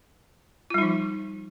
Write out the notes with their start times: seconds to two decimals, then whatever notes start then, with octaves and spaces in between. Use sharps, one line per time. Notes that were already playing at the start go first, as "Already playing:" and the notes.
0.70 F4
0.74 G3
0.78 D#4
0.82 F3